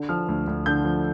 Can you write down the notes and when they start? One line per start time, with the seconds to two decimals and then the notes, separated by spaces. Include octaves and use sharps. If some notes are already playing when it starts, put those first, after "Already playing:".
Already playing: D3
0.09 F3 F6
0.28 D2
0.47 D2
0.66 D3 G6
0.85 F3